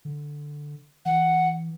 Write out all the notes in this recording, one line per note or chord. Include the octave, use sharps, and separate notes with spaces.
D3
E3 F#5